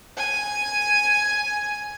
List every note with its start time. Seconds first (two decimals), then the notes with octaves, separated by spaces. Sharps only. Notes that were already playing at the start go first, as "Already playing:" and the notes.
0.17 G#5